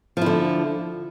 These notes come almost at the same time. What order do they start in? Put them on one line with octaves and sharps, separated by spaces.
F3 E4 D3